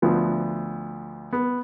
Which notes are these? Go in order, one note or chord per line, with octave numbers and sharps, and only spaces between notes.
D2 F3 B3
B3